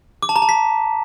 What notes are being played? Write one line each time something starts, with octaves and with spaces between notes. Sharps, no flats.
D6
A5
A#5
A5
B6